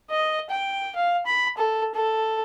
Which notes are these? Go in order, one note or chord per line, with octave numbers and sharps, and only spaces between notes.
D#5
G5
F5
B5
A4
A4